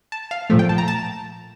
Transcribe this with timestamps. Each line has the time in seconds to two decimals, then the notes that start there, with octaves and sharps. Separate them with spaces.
0.12 A5
0.31 F5
0.50 A#2 F3 A3
0.59 G5
0.69 A5
0.78 A#5
0.88 A5